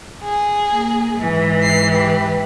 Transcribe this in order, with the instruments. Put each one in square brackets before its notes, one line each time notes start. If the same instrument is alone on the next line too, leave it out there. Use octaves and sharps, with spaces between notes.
[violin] G#4
[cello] A#3
G#2 E3
[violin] C7
G4 B4